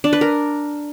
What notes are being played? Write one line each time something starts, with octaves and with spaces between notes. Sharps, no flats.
D4
B4
A#4